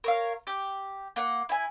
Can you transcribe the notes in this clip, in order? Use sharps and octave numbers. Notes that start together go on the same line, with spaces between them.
A#4 C#5 F5
G4
A#3 F#5
E4 G#5